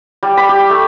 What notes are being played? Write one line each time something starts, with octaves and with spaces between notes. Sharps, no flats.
G3
B5
G4
A3